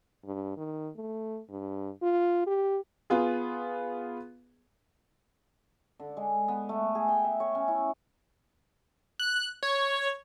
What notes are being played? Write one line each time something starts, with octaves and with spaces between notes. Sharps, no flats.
G2
D#3
A3
G2
F4
G4
B3 F4 G#4
D3
G#3
B3
A3
G#4
G5
E5
C#5
C#4
E4
F#6
C#5